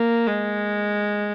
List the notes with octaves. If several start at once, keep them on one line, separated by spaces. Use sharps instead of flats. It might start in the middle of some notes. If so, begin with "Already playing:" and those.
Already playing: A#3
G#3